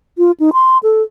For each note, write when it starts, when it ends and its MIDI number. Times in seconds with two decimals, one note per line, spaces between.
0.18 0.31 65
0.40 0.50 63
0.53 0.78 84
0.83 1.02 69